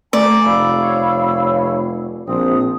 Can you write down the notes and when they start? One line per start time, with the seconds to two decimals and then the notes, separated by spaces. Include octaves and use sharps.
0.13 A3 D5 G#5 A#5
0.45 F1 F5 B5 E6
0.81 C#5
2.27 A#1 C4 D4 D#6